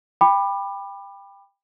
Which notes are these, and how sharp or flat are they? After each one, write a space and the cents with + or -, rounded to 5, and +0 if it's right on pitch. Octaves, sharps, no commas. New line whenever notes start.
G5 +20 B5 +0 D6 +25